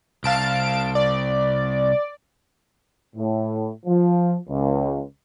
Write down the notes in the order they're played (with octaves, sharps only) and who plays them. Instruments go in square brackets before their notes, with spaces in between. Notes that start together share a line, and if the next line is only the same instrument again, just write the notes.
[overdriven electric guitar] C2 [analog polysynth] F5 A5 D7
[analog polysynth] D5
[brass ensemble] A2
F3
C#2